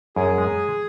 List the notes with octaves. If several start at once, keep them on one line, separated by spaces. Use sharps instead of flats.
F#2 G#4
G#3